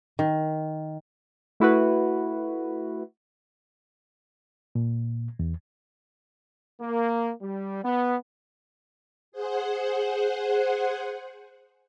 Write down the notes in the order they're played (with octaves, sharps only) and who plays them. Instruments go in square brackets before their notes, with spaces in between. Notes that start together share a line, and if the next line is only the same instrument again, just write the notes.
[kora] D#3
[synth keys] A3 E4 F#4 B4
[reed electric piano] A#2
E2
[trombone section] A#3
G3
B3
[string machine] G#4 C5 F#5